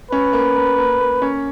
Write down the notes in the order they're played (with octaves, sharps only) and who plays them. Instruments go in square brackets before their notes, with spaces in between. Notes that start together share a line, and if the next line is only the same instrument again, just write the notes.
[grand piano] C#4 [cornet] B4
[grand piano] A#3
A#3
A#3
A#3
C#4